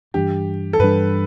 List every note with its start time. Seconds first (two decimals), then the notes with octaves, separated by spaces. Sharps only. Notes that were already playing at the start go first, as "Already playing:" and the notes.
0.14 G2 E3 G3 D4 G4
0.73 A4
0.80 G2 E3 G3 D4 B4